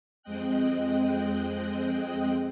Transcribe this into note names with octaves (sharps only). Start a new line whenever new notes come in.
F2 G#3 C4 D#5 G5 F#6